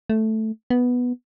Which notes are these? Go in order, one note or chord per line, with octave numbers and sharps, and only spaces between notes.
A3
B3